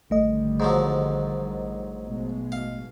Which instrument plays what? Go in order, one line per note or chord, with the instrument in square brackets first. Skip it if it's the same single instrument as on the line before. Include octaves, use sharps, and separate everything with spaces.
[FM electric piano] A1 A3 D#5 [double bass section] D3 D#3 G3
[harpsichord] G#2 F3 F#3
[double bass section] B1 B2 G#3
[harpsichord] F5